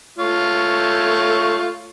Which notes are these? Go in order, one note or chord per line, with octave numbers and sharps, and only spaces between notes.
A3 F4 C#5